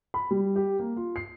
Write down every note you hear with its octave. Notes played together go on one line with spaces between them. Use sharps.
B5
G3
G4
A#3
F4
C7